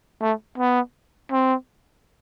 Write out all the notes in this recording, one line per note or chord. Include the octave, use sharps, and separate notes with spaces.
A3
B3
C4